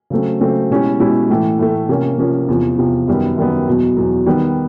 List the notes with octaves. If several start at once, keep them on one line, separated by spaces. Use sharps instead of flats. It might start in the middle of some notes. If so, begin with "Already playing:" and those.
C#3 F#3 A3 C4
C#3 F#3 A3 C4
B2 G#3 C#4 E4 G4
B2 G#3 C#4 E4 G4
A2 E3 A3
A2 E3 A3
C3 F3 A#3 C#4
C3 F3 A#3 C#4
E2 C3 F3
E2 C3 F3
F#2 D#3 G3 B3
F#2 D#3 G3 B3
E2 B2 F#3
E2 B2 F#3
D#3 G3 B3